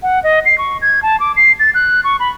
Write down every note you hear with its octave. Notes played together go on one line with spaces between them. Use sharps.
F#5
D#5
C7
C#6
G#6
A5
D6
C7
A6
F#6
C#6
B5